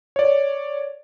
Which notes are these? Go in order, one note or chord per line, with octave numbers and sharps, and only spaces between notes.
C#5 D5